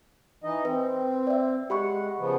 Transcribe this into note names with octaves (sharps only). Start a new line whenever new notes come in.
E3 D#4 D#5
C4 B4
D5 E5
G#3 G4 F#5 B5 C#6
C#3 F3 B3